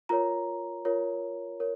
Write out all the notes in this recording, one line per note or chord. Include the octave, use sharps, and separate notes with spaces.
F4 A#4 C#5 A#5
F4 A#4 C#5
A#4 C#5